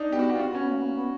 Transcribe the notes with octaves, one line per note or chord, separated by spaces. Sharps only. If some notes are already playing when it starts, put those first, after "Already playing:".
Already playing: D4 D#4
B3 G4
F#4
G4
F4
C4 F#4
B3
C#4
B3
A#3
B3
A#3
B3